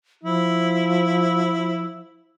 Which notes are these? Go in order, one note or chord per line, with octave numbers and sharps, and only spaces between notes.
F3 E4